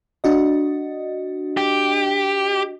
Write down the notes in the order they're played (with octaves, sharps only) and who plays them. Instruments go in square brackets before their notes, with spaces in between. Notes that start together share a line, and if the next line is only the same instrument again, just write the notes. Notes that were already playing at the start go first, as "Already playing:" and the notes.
[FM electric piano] D4 F#4 D#5
[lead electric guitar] G4